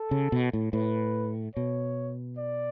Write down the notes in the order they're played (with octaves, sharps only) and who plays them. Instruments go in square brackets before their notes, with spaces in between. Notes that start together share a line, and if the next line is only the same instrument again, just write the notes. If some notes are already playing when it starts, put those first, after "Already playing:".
Already playing: [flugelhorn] A4
[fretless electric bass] C#3
B2
A2
[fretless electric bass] A2 [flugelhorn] B4
[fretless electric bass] B2 [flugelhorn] C#5
[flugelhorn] D5